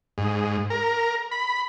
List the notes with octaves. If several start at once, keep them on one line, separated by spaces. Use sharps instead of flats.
G#2
A#4
B5